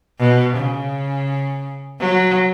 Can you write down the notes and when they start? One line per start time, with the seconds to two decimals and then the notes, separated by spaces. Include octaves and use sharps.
0.20 B2
0.57 C#3
2.00 F#3